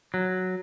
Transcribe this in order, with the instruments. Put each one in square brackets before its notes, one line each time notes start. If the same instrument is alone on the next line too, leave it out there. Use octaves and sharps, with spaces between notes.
[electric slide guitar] F#3